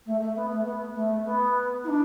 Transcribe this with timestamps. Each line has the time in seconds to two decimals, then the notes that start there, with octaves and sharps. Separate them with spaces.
0.06 A3
0.21 A3
0.36 B3
0.50 A3
0.65 B3
0.95 A3
1.24 B3
1.84 E4
1.88 D4